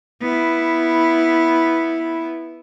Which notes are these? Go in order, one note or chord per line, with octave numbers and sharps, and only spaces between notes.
B3 E4